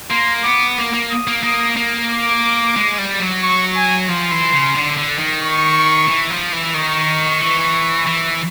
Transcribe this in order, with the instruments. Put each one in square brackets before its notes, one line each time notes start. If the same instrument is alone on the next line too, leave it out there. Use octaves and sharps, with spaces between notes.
[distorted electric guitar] A#3 [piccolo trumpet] C6
[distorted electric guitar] B3 [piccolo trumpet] D6
[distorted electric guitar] A#3 [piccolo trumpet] D6
[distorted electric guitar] A#3
[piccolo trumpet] D#6
[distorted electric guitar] A#3
[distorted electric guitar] A#3 [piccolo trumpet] D#6
[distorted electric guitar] A#3
[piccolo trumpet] D6
[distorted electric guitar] G#3
G3
F#3
[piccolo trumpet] C#6
G#5
[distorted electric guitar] F3 [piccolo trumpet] C6
[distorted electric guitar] E3
C#3
D3
D3
D#3
[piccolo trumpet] C#6
[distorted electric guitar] E3
F3
E3
[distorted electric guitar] D#3 [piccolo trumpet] C#6
[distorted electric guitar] E3
E3